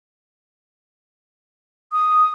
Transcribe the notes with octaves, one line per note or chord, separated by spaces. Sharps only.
D#6